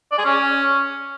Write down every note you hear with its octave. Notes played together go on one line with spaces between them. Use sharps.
D5
G#4
C#4